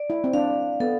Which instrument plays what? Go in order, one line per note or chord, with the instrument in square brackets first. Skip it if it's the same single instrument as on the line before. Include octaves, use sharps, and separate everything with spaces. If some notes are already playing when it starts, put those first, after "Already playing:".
Already playing: [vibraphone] D5
[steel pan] E4
C4
[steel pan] D4 [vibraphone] F5
[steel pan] B3 [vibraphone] A4